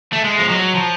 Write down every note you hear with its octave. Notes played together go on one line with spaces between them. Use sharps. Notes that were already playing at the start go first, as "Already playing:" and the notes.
A3
G#3
F3
F#3
F3